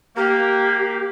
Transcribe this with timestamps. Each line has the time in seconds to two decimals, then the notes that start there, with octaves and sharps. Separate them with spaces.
0.17 A#3 G4